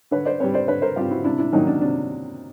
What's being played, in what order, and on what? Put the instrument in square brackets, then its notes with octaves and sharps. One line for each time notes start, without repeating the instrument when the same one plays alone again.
[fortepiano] D3 B4 C#5
C5 D5
G3 C4 B4 C#5
C5 D5
D3 B4 C#5
A#4 C5
G3 C4 F4 G4
E4 F#4
C3 D4 E4
D4 E4
D#3 F#3 A#3 C#4 D#4
D4
C3 D4